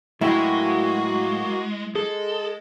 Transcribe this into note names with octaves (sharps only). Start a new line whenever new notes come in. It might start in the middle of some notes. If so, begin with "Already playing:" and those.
A2 F#3 G#3 A#3 E4 F#4 G5
G#3 G#4 A4